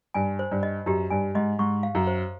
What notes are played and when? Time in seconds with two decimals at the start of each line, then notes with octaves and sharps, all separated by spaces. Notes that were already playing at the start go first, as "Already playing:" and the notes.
0.14 G2 G#5
0.39 C5
0.52 G2
0.63 D#5
0.86 F#2 G4
1.10 G2 G#5
1.35 G#2 D#5
1.59 G#2 C#6
1.83 F5
1.95 F#2
2.07 C5